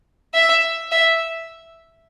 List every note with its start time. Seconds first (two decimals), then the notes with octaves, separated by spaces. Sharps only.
0.34 E5
0.91 E5